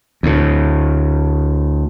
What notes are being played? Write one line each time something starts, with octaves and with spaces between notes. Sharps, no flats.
D2 A2